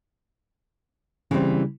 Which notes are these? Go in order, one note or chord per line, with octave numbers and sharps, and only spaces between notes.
C#3 E3 G3 C4